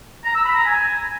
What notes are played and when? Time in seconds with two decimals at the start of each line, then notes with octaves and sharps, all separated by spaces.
0.24 A#5
0.35 E6
0.45 B5
0.55 A#5
0.65 G#5